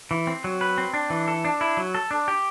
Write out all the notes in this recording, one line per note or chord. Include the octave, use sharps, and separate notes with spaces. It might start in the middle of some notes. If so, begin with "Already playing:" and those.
E3
C4
F#3
B4
C4
D4
E3
A4
D4
E4
F#3
A4
D4
G4